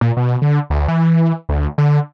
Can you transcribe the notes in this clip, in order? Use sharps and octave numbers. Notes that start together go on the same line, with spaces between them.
A#2
B2
D3
D2
E3
D2
D3